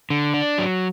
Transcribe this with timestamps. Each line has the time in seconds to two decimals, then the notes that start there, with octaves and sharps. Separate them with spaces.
0.10 D3
0.34 D4
0.58 F#3